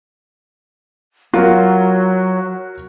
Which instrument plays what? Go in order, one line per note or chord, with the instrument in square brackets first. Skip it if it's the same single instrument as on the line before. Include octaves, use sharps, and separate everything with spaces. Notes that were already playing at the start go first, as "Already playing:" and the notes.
[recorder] F#3 [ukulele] F4 [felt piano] F#4 A#4